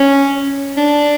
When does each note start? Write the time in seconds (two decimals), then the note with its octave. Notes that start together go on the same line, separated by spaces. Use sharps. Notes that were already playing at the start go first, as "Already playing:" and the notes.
Already playing: C#4
0.77 D4